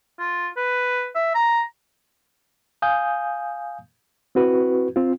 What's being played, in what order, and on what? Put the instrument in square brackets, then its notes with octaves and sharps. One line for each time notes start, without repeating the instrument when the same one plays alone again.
[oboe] F4
B4
E5
A#5
[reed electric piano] F5 G#5 D#6 G6
C4 E4 F#4 B4
C4 F4